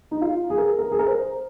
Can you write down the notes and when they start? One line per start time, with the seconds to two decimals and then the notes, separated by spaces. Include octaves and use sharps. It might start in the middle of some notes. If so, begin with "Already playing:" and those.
0.11 D#4
0.21 F4
0.50 G#4
0.58 A#4
0.65 G#4
0.79 A#4
0.91 G#4
0.99 A#4
1.07 C5